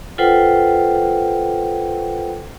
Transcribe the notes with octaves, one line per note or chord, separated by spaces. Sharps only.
F4 A4 B4 C5 F#5 G5